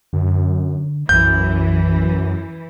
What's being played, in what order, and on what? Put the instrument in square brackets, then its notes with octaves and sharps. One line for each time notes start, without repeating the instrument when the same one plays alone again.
[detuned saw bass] F#2 [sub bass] D3
[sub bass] B1 [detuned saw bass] F#2 [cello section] E3 [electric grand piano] G6